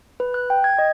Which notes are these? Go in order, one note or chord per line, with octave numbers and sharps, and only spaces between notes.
B4
F#6
G5
G#6
D#5